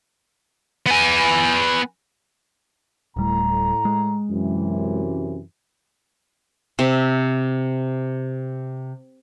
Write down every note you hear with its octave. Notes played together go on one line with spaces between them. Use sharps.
B3 G#5
D1 A2 G3 A#5
G#3
F#2 C3 E3
C3 E5